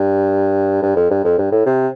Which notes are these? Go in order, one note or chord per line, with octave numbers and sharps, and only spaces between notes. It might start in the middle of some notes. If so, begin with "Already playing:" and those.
Already playing: G2
G2
F2
G2
F2
G2
A2
C3